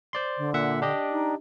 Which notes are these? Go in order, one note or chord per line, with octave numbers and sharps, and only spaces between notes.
C5 D5 C6
D3
A#2 E5 F#5
D4 G4 D#5
D#4